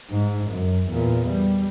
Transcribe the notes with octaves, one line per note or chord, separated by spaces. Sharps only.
G#2
F#2
E2 A#2
G3